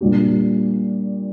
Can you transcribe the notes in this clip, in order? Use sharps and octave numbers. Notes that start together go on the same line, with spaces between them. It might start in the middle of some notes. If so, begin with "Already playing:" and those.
A#2 G3 D4 G4